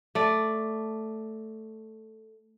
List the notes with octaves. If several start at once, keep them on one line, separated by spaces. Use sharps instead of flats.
A3 D5